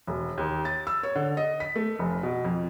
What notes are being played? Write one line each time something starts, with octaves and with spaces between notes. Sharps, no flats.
E1
D#2
A6
E6
C#5
D3
D#5
B6
A3
F1
B2
F2